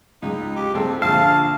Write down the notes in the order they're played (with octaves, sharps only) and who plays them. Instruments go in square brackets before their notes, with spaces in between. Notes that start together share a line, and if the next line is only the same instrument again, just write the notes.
[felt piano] C#2 [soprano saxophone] D#4
[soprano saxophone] G4
[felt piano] C#2 A4 [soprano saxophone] C4
[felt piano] A#1 D3 E6 [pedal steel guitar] F5 [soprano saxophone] A5